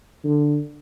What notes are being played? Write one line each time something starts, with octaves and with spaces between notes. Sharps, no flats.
D3